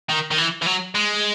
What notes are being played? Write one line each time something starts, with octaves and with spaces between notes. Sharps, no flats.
D#3
D#3
E3
E3
F#3
G#3